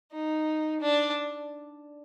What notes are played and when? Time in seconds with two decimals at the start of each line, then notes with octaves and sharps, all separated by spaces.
0.13 D#4
0.81 D4